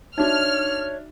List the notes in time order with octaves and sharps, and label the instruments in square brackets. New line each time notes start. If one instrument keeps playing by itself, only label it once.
[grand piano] D4 E5 [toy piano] D#4 F#4 [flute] C#5 [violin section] F6